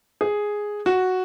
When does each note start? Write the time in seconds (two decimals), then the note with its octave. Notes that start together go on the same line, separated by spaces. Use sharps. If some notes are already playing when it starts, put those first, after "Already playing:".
0.21 G#4
0.86 F#4